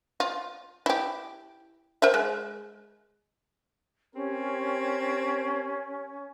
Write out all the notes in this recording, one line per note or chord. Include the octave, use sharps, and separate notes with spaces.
F4
E4 G4
A#4 C5 E5
G#3
C4 C#4 G4 A#4